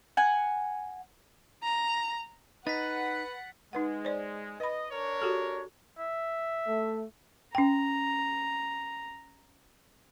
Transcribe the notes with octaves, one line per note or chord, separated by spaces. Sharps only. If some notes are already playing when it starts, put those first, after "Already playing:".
F#5 G#5
A#5
D#4 B4 F#5 A6 B6
G#3 D#4 B4 F#5
C5 D5
B4 D#5 B5
D4 A#4 C#5
F#4 G4 A4
E5
A3
C#4 G5 A#5